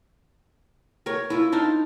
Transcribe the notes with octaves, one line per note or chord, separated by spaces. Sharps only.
A#4 C#5
E4 F4
D4 D#4 C5 F5